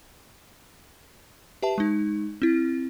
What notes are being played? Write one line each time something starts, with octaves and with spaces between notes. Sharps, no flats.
G4 B4 E5 A5
G#3 D#4
C4 E4